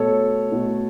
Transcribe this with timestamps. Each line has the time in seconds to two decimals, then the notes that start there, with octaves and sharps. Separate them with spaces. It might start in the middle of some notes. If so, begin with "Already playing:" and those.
Already playing: B2 A3 A4 C#5
0.52 B2 A3